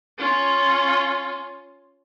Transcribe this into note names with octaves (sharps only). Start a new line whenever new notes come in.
C#4 F4